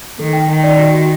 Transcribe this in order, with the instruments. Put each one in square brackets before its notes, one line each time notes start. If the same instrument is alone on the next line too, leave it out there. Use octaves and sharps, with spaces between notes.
[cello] D#3 [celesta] A4
[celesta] G5
[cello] D#3 [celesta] G5
[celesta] D5
F#4
F#4